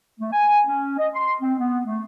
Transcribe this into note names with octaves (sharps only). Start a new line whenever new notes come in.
A3
G#5
C#4
D#5
C6
C4
B3
A3